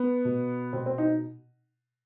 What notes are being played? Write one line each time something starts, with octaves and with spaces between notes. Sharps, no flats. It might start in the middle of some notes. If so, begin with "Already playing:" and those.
Already playing: B3
B2
B2 C4
C4
D#4